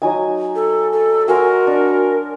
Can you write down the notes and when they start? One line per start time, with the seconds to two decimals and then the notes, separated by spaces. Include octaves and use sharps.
0.02 F#3 D#4 G#5
0.55 A4
0.92 A4
1.28 F#4 A#4 G#5 C6
1.67 D4